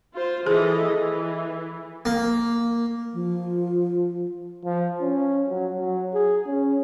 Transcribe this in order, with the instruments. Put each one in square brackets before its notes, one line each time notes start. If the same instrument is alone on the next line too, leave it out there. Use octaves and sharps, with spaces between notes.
[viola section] F4 C5
[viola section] E3 A4 D#5 [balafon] G#4
[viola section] E3
[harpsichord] A#3
[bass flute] F3
[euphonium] F3
C#4
F#3
F#3
G#4
C#4